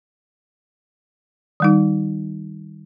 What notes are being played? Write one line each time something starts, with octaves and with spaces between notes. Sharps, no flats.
D#3 G3 D#4